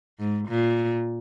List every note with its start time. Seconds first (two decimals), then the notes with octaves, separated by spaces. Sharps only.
0.19 G#2
0.48 A#2